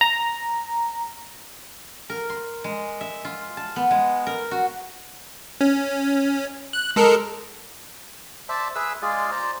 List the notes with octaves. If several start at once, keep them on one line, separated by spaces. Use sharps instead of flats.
A#5
A#4
C6
G#3
E5
F4
A5
B3
G#3
A#4
F#4
C#4
F#6
G#3 A4 A#4
C5 D5 E5 A5
G#4 B4 E5 E6
G#3 F4 G#4 D5
C5 D5 A#5